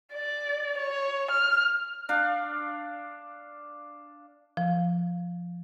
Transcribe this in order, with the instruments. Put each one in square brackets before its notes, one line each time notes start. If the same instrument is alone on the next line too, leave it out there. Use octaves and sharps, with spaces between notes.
[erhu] D5
C#5
F6
[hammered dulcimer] D4 F5
[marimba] F3